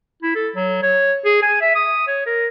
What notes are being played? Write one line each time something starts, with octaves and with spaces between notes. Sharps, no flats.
E4
A4
F#3
C#5
G#4
G#5
E5
D#6
C#5
A#4